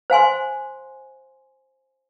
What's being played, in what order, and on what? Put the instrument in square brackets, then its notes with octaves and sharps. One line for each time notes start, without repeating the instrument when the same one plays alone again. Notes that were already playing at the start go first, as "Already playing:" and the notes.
[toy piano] C5 F5 G#5 C6